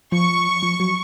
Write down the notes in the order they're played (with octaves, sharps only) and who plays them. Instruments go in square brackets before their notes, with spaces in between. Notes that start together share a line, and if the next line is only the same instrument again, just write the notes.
[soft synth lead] F3 [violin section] C#6
[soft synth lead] F3
F#3